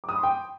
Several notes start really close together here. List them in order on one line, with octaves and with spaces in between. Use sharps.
D6 D#6 B5 C6 G5